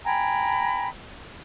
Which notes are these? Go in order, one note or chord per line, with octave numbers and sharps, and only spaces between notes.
G5 G#5 A#5 B5